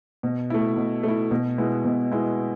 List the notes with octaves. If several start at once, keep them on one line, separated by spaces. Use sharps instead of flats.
B2
A3 E4
B2
A3 E4
B2
G#3 B3 E4
B2
G#3 B3 E4